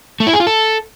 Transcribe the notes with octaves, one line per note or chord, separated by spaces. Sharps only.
A3
E4
G#4
F4
A4